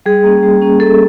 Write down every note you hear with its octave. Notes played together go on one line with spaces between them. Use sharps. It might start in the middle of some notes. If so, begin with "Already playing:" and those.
G3 G#4
A#3 C#4
G3
A#3 C#4
G3 A4